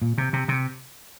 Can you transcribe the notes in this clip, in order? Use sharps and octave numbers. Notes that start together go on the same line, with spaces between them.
A#2
C3
C3
C3